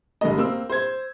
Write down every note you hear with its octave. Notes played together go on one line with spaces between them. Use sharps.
G1 D3 G3 G#3 A#3 D#5
A#3 C4 E6
C5 G#6